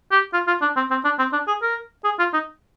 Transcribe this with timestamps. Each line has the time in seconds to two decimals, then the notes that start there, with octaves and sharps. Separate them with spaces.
0.11 G4
0.33 F4
0.47 F4
0.62 D4
0.76 C4
0.91 C4
1.05 D4
1.18 C4
1.33 D4
1.47 G#4
1.62 A#4
2.04 G#4
2.19 F4
2.33 D#4